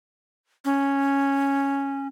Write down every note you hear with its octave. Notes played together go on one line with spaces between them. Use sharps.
C#4